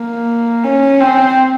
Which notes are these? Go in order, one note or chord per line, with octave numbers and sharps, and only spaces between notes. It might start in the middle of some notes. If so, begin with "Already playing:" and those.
Already playing: A#3
C#4
C4